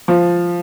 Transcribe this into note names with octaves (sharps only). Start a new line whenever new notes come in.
F3